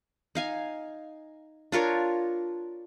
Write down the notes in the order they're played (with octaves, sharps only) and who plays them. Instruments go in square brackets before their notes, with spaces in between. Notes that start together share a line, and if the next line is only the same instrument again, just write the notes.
[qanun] D#4 F5 G#5
D4 F4 A#4 C#5